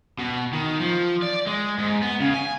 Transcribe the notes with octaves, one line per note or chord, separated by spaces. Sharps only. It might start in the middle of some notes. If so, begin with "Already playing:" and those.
B2
D#3
F3
D5
G#3
G#2
B3
C#3
G#5